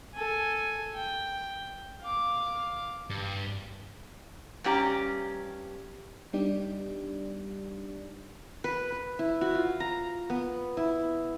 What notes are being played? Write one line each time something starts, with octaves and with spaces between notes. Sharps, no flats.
A4 G#5
G5
F5 D6
G2
G2 C#4 G4 A#5
G3 B3 D4 D#4 G4 D5
B4
B4
E4
F#4
F4
A#5
B3
E4